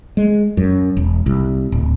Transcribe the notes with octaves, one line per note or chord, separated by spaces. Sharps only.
G#3
F#2
E1
C2
D1